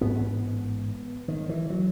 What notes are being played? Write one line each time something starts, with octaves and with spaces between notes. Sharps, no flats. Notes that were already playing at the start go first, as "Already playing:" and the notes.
A1 G#2 B3
D#3
E3
F#3